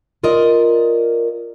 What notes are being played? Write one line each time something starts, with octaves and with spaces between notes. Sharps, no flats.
F4 A#4 D5 D#5